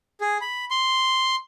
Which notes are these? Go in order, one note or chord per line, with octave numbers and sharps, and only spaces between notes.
G#4
B5
C6